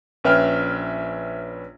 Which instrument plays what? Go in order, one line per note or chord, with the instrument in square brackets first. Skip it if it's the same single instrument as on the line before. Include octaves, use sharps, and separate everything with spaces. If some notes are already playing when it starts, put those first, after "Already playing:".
[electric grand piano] A#1 C#4 B4 E5 G5 F6